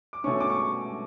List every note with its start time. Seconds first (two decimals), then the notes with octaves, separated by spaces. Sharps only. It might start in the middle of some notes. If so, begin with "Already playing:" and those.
0.13 D6
0.24 C#4 C#6
0.27 B2 A3
0.40 D6
0.50 C#6